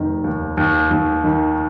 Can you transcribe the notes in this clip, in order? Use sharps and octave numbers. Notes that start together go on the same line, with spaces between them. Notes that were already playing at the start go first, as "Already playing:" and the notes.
Already playing: F1 D#3
D#2
D#2
D#2
D#3